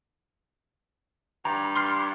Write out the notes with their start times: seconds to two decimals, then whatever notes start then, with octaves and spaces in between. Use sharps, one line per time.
1.45 G2 A#5
1.76 C6 F6 C7